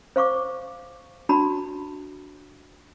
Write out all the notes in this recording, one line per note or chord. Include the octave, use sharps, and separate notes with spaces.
C5 F5 C#6 D6
D4 F#4 A5 B5